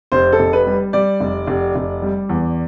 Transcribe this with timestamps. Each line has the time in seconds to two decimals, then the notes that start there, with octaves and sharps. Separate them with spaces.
0.12 F1 C5
0.32 A4
0.40 F1
0.53 B4
0.67 G3
0.93 G3 D5
1.20 F1
1.47 F1
1.75 F1
2.02 G3
2.29 E2